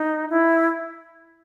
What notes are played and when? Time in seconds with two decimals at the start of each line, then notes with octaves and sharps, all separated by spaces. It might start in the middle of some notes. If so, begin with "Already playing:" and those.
Already playing: D#4
0.30 E4